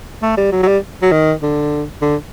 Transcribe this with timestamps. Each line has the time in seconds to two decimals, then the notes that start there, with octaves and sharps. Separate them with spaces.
0.22 A3
0.37 G3
0.52 F#3
0.63 F#3
0.67 G3
1.02 F#3
1.12 D#3
1.43 D3
2.02 D3